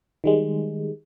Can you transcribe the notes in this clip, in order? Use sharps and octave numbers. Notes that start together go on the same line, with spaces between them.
D#3 G3 G#3